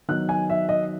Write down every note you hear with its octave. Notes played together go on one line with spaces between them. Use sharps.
D#3 F#3 B3 F#6
G#5
E5
D#5